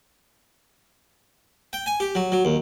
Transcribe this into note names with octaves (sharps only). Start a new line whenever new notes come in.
G5
G#5
G4
F#3
F#3
D#2